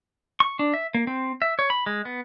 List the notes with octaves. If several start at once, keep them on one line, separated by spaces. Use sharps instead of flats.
C#6
D4
E5
A#3
C4
E5
C#5
B5
G#3
B3